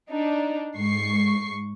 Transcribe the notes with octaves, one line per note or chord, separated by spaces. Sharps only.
D4 D#4
G#2 C#6 C7